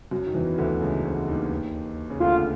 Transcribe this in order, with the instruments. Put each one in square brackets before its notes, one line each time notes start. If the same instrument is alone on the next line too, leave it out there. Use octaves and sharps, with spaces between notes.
[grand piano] F#2 F#3
D#3
E2 E3
D2 D3
C#2 C#3
D2 D3
D#2 D#3
C#3
[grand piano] D2 D3 [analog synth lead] F4